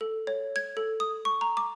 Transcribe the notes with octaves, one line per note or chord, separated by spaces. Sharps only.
A4
C#5
G#6
A4
D#6
C#6
A#5
D6